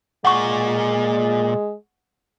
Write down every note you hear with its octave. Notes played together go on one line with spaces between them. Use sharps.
A#2 G#3 F#5 C#6